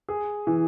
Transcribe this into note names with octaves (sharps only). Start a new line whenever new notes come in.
G#4
E3